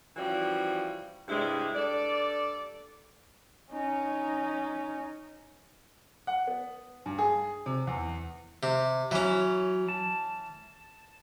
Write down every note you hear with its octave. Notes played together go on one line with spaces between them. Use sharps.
E3 F3 G3 C#4 F#4
G2 C3 G3 G#3 E4
G2 A4 D5
C#4 D#4
F#5
B3
G2
G#4
C3
E2
C3
E3 F#3 C#4
A5